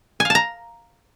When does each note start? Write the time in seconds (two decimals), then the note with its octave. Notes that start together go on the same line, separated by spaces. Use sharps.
0.20 G#5
0.25 F5
0.30 A5
0.35 A#5